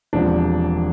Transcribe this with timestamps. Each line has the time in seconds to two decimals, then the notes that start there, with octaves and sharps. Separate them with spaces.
0.13 E1 E2 C3 F3 D4